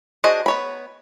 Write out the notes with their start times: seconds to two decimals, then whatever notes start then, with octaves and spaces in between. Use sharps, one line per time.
0.24 D4 F#4 G#4 C5 D#5
0.46 B3 C#5 B5